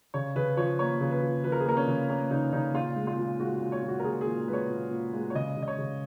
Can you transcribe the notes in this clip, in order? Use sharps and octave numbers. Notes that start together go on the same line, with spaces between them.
C#3 C#5
C#3 B4
F3 C#5
A#3 C#5
C#3
B4
F3
F3 B4
A#4
G#4
A#3 A#4
C#4
C#3
A#3 C#4
C#3 D#4
C#3 D#4
A#2 F4
G#3
F4
A#2
G#3 F#4
A#2
C#5
A#2
F#4
A#4
A#2 G#4
G#4
A#2
G#3 B4
C#5
A#2
A#2
G#3
C#5
C#3 D#5
C#3
D#5
C#5
C#3